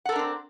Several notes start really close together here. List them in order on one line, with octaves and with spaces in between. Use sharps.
F#5 A4 A#4 D4 C4